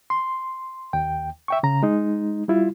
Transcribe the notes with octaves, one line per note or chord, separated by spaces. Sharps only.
C6
D#2 G5
E5 G5 C#6
C#3 A#5
G#3 D#4
G3 E4 F4